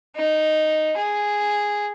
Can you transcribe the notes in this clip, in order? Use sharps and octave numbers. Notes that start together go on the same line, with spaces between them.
D#4
G#4